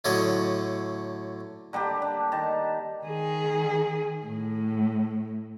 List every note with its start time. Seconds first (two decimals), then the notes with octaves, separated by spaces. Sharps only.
0.05 A2 D3 F#3 C#5 D#5
1.73 D3 G3 A#3 G4
2.02 D4
2.32 D#3 A5
3.04 D#3 G#4
4.26 A2